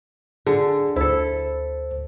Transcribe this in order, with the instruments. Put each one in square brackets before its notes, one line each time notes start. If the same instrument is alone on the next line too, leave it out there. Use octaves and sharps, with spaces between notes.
[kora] D3 [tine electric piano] G#4
[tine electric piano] D2 C5 [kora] E4 A4